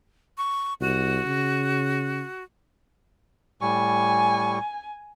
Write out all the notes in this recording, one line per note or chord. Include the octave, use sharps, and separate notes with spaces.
C#6
C2 F#4
C#3
A2 G3 G#5 C#6